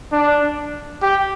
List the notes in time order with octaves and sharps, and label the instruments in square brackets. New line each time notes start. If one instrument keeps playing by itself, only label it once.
[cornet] D4
G4